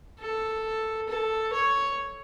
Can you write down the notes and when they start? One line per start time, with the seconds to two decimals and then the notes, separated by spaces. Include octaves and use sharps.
0.19 A4
1.08 A4
1.53 C#5